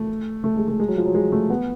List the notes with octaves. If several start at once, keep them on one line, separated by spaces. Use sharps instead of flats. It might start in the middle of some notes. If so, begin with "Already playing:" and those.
Already playing: A3
A3
G#3
A3
G#3
F#3
F3
F#3
G#3
A3
B3